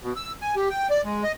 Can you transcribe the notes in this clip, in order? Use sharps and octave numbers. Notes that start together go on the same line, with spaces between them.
B2
E6
G#5
G4
G5
D5
G#3
D#5